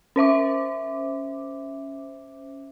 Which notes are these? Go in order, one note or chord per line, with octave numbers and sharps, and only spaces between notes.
C#4 C5 E5 D6